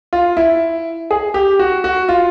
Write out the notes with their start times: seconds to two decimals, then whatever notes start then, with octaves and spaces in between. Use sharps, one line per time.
0.13 F4
0.37 E4
1.11 G#4
1.34 G4
1.59 F#4
1.84 F#4
2.09 F4